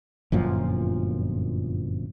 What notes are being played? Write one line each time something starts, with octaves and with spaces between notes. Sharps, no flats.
G1 F#2 A#2 F3